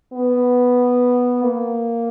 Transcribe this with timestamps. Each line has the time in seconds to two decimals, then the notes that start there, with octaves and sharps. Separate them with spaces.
0.13 B3
1.42 A#3